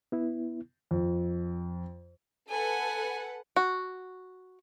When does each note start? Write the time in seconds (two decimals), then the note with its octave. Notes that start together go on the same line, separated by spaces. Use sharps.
0.12 B3 E4
0.91 F2
2.49 A4 B4 F#5 G#5
3.56 F#4